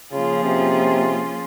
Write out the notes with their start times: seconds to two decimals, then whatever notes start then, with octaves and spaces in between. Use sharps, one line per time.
0.12 C#3 F3 A#3 C#4 F4 G#4
0.44 C3